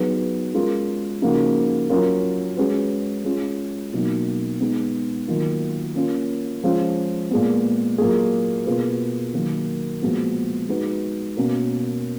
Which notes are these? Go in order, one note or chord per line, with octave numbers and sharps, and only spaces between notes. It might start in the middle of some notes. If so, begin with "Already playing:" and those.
Already playing: F#3 B3 D#4 G#4 B4
G#3 C#4 F4 A#4
C#3 F3 A#3 D#4 F#4
F#3 C#4 F4 A#4
G#3 C#4 F#4 B4
G#3 C#4 F4
B2 F#3 A#3 D#4
G#3 B3 D#4
D#3 F#3 A#3 F4
A#3 C#4 F4
F3 G#3 C#4 F4
A#2 G#3 B3
A#2 F#3 A#3 F4 G#4
B2 A#3 F4 G#4 B4
D#3 F#3 A#3
A#2 F3 G#3 B3 F#4
G#3 D#4 F#4 B4
B2 A#3 C#4 F#4 A#4